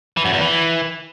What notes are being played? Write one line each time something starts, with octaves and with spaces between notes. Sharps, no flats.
E3
F#2
E2
E3